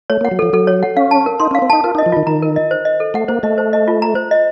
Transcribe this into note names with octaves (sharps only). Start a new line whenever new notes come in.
A3 C#5
A#3
F#5
F#3
F3 A4
F#3 A4
C#5
F#5
C#4 F5
A5
A#4
D#4 C6
C#4
F5
C4
D#4 A5
F4 A#4
D#4
D#5
F3
D#3 F4
D#3 A#5
A#4
D#5
C5
D#5
A4
A3 F#5
A#3 C5
A3 D#5
C5
D#5
F4
A#5
C5
D#5